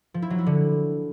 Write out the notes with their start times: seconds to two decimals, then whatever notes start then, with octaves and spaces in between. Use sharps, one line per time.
0.14 F3
0.22 E4
0.30 F#3
0.38 E4
0.46 D3